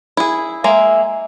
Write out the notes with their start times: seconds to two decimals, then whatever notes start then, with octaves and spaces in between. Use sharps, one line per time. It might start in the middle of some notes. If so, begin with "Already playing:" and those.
0.17 E4 G#4
0.64 G#3 A#3 E5